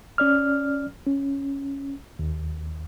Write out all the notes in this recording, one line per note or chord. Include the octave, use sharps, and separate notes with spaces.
C#4 D5 F6
C#4
D#2